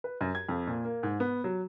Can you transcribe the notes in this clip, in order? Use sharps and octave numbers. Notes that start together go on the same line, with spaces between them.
B4
F#2
G#6
F2
A#2
A#3
G#2
B3
F#3